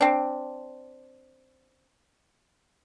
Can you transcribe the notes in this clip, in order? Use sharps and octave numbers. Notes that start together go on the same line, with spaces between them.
C4 D4